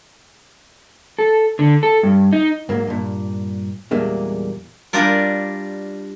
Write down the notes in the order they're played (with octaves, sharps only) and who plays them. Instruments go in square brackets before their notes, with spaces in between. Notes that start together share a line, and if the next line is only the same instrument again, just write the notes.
[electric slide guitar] A4
D3
A4
G2
D#4
[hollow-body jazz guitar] G#2 F#3 A#3
G2 A#2
E2 A#2 G3 G#3 A#3 D4
[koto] G3 D4 F4 A#4